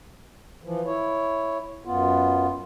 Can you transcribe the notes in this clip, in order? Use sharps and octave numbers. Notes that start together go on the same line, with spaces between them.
E3 F3
E4 C#5
F#2 B3 F4